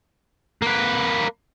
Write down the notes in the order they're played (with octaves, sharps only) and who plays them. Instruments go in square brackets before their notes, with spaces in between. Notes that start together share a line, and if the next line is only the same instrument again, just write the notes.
[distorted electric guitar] A#3 B4